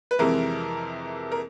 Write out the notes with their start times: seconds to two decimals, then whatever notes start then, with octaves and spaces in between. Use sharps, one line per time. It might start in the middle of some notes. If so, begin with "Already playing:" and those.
0.11 B4
0.19 F2 C3 E3 G#3 A#4
1.32 A#4